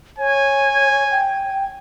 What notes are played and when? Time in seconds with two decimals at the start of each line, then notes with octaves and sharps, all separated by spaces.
0.18 C#5 G#5
1.11 G5